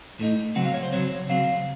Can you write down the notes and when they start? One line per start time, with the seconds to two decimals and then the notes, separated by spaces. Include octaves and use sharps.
0.20 A2 A3 D#4
0.55 C#3 F#3 C4 F#5
0.65 F5
0.74 C#5
0.83 C5
0.93 C#3 F#3 C4 C#5
1.29 C#3 F#3 C4 F5